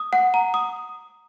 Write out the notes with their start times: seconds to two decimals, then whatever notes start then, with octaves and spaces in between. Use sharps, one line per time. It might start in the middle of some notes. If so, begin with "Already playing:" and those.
Already playing: D#6
0.13 F#5
0.34 A#5
0.54 D#6